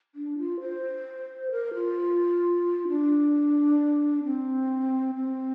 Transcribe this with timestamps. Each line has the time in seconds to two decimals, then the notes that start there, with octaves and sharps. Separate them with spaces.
0.15 D4
0.38 F4
0.61 C5
1.51 A#4
1.75 F4
2.88 D4
4.24 C4
5.15 C4